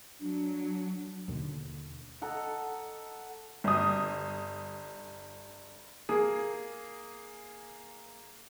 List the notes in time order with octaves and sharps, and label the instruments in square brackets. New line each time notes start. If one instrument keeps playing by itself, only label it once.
[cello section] F#3 [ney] D4
[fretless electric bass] D#2 B2 D3 D#3
[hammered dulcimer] A4 D#5 F#5 A#5
[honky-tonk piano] G1 D#6
[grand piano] A#3 G#4